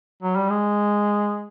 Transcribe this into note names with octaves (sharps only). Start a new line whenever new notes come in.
F#3
G3
G#3